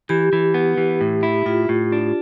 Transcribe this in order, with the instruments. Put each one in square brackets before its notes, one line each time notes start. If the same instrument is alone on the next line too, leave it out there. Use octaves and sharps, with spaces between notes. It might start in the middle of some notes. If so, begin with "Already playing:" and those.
[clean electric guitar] E3 [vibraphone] G4
[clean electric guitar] E3
B3
E3
A2
E4
[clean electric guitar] A2 [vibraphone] F4
[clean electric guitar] A2
D4